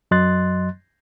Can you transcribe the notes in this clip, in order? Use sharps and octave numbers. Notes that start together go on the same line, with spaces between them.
F#2 F#3 D#5 C6 F#6 A6